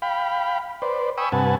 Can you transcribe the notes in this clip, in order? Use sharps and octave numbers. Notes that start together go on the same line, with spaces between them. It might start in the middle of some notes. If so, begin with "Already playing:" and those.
F5 G5 B5
B4 C5 D5
G5 G#5 B5 C#6 D#6 E6
G2 C3 B4 F#5 G#5 A5